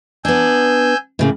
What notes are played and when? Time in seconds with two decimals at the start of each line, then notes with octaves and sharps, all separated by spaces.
0.25 B3 D4 G#5 E6 G6
1.19 A2 C#3 A#3